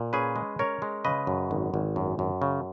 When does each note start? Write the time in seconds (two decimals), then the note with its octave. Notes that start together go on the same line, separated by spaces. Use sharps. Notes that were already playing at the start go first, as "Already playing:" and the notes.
Already playing: A#2
0.13 C#4 G#4 B4
0.36 G#3
0.59 C#4 A#4 C#5
0.82 G#3
1.05 C#3 B4 D#5
1.27 F#2
1.51 G#1
1.74 G#1
1.96 F#2
2.19 F#2
2.42 C#3